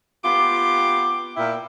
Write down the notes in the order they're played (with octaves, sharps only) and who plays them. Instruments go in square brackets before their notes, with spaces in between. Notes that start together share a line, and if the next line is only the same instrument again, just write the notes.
[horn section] B3 F4 G4 [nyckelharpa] D6
[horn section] A#2 E4 G5